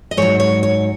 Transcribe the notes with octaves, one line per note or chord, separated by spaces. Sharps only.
D#5
G#2 F#3 C#5
C#5
C#5